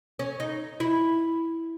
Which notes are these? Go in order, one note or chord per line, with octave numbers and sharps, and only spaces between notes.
C#4
D#4
E4